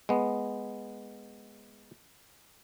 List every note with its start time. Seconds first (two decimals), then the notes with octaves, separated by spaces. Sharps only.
0.09 G#3 B3